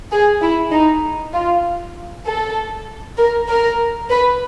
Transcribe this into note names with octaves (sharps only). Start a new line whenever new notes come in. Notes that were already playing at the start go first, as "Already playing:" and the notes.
G#4
E4
D#4
F4
A4
A#4
A#4
B4